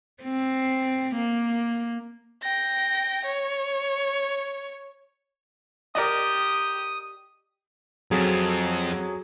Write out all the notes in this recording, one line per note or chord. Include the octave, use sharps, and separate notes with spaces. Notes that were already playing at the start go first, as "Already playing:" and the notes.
C4
A#3
G5 A#6
C#5
G4 A#4 D5 D#5 D#6
F2 F#3 G#4 A4